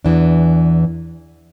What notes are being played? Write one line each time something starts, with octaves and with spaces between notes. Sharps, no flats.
E2 E3 D4